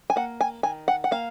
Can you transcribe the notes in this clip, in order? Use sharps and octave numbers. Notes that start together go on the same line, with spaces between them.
G#5
A#3 F#5
G#5
D#3 G#5
F#5
F#5
A#3 F5